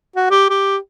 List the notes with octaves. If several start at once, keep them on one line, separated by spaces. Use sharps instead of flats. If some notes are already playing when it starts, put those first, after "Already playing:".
F#4
G4
G4